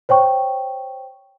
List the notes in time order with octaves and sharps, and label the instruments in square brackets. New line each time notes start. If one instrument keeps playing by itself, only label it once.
[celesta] C5 C#5 G5 C#6